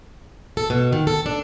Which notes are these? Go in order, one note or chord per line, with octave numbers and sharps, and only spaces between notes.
A4
B2
D#3
A4
D4